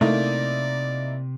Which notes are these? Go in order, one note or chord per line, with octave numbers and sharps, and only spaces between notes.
C3 A3 A#3 D#4 E4 D5